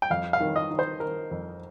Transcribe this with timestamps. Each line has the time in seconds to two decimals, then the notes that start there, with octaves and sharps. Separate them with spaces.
0.02 G5
0.10 F2 F5
0.33 F5
0.40 D#3
0.56 D#5
0.71 D#3
0.79 C5
1.00 D#3 A#4
1.31 F2